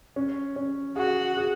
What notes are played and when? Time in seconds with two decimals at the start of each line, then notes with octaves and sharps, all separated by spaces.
0.16 C#4
0.56 C#4
0.96 F#4 G#4
1.37 G#4